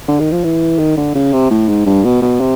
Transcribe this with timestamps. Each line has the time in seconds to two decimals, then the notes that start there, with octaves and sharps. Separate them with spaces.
0.08 D3
0.20 D#3
0.32 F3
0.44 E3
0.79 D#3
0.97 D3
1.15 C#3
1.33 C3
1.51 A2
1.68 G#2
1.86 G2
2.04 B2
2.22 B2
2.41 C3